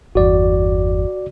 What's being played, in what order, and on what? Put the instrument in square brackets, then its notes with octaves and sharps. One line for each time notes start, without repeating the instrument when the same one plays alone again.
[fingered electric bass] G1 E2 [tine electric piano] F#4 D5